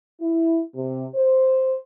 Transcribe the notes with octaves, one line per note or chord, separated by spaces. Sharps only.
E4
C3
C5